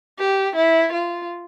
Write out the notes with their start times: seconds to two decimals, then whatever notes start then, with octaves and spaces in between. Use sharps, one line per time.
0.19 G4
0.56 E4
0.93 F4